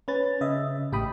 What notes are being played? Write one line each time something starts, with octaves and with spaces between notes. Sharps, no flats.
C#4 B4 A6
C#3 D#5 E5
A1 A2 G4 G5 B5 D#6